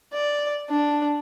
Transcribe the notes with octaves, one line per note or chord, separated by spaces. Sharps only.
D5
D4